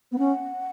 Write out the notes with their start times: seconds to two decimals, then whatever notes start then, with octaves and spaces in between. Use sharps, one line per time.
0.12 B3
0.18 C#4 F#5